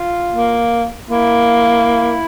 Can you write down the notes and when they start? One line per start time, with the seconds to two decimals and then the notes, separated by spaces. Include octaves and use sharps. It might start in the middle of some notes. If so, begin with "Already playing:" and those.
Already playing: F4
0.33 A#3
1.09 A#3 E4